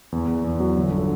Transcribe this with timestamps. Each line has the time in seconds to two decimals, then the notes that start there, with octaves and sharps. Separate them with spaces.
0.12 E2
0.28 E2
0.44 E2
0.60 F#3
0.76 G1
0.91 D3